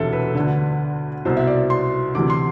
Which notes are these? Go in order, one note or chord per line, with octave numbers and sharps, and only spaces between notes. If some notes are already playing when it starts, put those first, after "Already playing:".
Already playing: E1 D2 C3 E3 A4 E5
B4
D3
D2
C2 B2 C5
E5
D5
C6
D2 C3 E3 D6
C6